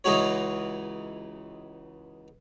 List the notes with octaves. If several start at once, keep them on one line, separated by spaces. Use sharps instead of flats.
C#2 E3 G#3 D#4 F#4 C#5